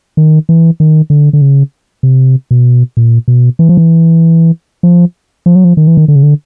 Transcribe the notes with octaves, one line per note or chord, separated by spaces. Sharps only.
D#3
E3
D#3
D3
D3
C#3
C3
B2
A#2
B2
E3
F3
E3
F3
F3
F#3
F3
D#3
E3
D#3
D3
C#3
D3